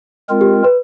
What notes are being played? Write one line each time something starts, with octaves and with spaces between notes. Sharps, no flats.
G#3 C4 F4 A#4
G4
B4